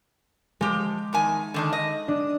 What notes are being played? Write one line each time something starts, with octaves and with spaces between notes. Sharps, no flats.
F3 G#3 G4
E2 D#3 G#5
D3 D#3 D4
D#5
D4